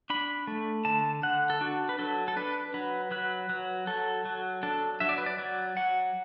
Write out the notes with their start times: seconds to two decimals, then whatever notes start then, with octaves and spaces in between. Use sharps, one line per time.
0.10 D4 B5
0.47 A3
0.85 D3 A5
1.23 D3 F#5
1.50 A4
1.61 D4 F#4
1.89 B4
1.99 F#3 A4
2.28 A4
2.36 D4 B4
2.74 F#3 B4
3.11 F#3 B4
3.50 F#3
3.87 F#3 A4
4.25 F#3
4.63 D4 A4
5.00 F#3 E5
5.09 D5
5.18 B4
5.26 D5
5.38 F#3 D5
5.77 F#3 F#5